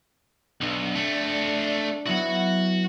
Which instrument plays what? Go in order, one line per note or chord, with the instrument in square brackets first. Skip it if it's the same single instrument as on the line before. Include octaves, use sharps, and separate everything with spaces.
[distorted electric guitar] B1 [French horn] D4
[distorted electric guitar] A3 C4
[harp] F#3 B3 E4 [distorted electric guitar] F#4 F#5